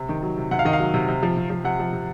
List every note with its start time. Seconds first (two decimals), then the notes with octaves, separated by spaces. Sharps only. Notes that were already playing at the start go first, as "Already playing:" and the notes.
Already playing: C3
0.09 D#3
0.22 F#3
0.37 C3
0.51 C3 F#5
0.59 F5
0.65 D#3 D#5
0.73 F5
0.79 F#3
0.94 C3
1.08 C3
1.23 F3
1.37 C3
1.50 F3
1.64 C3 F#5
1.79 F3
1.93 C3